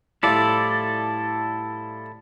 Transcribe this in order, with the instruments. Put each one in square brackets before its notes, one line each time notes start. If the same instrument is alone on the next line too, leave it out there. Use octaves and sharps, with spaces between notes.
[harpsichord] A2 F3 G3 [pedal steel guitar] E4 A4 D5